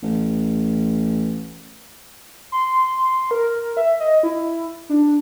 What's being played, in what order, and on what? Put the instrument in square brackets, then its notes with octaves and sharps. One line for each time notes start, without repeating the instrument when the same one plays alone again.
[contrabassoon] A1
[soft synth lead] C6
A#4
E5
D#5
E4
D4